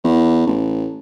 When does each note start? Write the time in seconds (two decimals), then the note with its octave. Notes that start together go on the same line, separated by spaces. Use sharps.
0.04 E2
0.47 A1